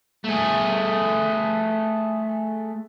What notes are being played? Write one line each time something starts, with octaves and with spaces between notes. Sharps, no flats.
A3 G#4